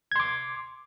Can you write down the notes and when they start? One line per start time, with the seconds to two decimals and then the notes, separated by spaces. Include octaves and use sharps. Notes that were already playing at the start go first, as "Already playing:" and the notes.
0.12 G#6
0.16 C6
0.20 D6